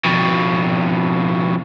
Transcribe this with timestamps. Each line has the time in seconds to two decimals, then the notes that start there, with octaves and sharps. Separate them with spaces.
0.05 F2 B2